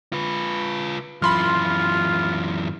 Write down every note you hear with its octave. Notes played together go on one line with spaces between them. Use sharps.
F4 B4
F#2 E3 F4 B5 C6 F6